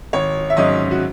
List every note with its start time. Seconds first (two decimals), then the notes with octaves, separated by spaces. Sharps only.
0.13 G#1 C#5
0.50 E5
0.57 G#2 F#3 C#4 D#5
0.91 F#4